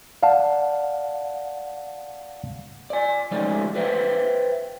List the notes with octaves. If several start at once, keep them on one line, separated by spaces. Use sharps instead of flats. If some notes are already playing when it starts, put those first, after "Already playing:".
D5 F5 F#5 A5
D5 G#5
F3 G#3 A3 C#4 D#4 D5
B4 C5 E5 F5 G5